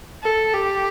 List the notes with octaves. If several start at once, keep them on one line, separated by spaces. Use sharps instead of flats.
A4
G4